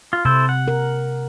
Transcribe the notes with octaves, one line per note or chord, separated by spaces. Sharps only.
F4
C3 E4 A4 C5
F#5
A#4